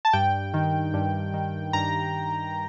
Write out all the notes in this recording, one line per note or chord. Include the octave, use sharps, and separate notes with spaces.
A5
G2 G5
D#3
G2
D#3
G2 A#5